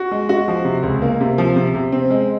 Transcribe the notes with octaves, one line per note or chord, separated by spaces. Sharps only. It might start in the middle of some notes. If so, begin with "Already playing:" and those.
Already playing: F#4
G#3
F#4
F3
C3
C#2
A#3
C3
F3
C3
C3
C4
G#3